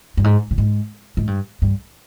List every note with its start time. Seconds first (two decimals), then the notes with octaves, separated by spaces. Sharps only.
0.17 G2
0.24 G#2
0.51 A#2
0.58 G#2
1.17 G#2
1.27 G2
1.62 G2